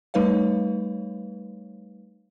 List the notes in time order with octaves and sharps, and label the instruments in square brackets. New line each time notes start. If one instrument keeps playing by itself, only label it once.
[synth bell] G3 A3 D#4 B4 C#5 F5